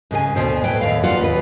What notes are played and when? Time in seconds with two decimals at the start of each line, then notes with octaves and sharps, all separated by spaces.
0.11 G#2 C#3 A4 G#5
0.36 D2 B2 C5
0.64 A2 B4 C#5 G5
0.81 D#2 A2 F5
1.04 F4 F#4 B4 D5 F5 F#5
1.20 D#2 B4